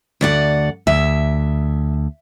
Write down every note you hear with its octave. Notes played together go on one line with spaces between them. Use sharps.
D2 D5 F#5
D2 E5